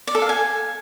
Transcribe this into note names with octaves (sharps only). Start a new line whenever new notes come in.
D5
A4
F5
G#5